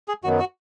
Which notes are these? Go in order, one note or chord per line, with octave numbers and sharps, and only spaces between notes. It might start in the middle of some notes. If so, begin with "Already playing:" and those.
G#4
F#2 D#3 F#3 B3 F#4
F#4